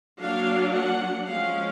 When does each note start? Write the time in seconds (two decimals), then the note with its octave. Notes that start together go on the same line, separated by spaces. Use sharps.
0.19 F#3 A#3 D4 F5
0.74 F#5
1.28 F3 G#3 C#4 F5